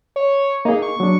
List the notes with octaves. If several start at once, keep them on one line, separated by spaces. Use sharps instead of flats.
C#5
A#3 D#4 G#4
C#6
F#3 D4